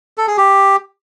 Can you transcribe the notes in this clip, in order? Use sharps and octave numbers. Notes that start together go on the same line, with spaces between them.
A4
G#4
G4